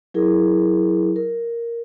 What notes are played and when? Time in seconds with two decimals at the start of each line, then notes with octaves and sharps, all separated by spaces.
0.14 F#3 E4 G#4 A#4
1.16 A#4